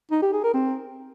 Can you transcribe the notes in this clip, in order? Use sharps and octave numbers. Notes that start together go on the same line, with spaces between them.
D#4
G4
G#4
A#4
C4